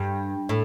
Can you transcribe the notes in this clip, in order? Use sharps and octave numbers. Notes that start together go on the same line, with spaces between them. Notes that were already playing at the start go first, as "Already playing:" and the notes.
Already playing: G2
A2